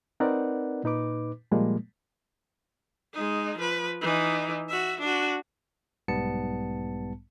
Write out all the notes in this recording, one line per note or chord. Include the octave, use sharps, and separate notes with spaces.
C4 D#4 A#4 B4 D5 F#5
A#2 D#4 B4 D6
A#2 F3 G3 G#3 A#3
G#3 D#4
F3 B4
E3 D#4
F#4 E5
D4 F#4
B1 G#2 G3 B3 A5 C#7